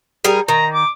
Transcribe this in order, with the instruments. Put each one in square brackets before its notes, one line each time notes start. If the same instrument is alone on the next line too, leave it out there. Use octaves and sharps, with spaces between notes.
[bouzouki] G3 G#4 A#4
[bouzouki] D#3 [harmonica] A#5
[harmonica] D6